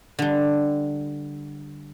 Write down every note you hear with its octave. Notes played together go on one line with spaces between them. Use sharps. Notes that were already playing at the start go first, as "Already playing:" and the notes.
D3 G3